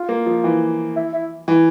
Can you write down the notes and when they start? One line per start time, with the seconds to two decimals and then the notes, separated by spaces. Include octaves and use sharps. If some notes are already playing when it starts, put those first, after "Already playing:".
Already playing: F4
0.09 A#3
0.26 F3
0.44 E3
0.96 E4
1.13 E4
1.48 E3